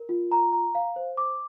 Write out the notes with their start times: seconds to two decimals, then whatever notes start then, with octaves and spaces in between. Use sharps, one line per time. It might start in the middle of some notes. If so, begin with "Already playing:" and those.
Already playing: A#4
0.09 F4
0.32 A#5
0.53 A#5
0.75 F5
0.96 C5
1.17 D6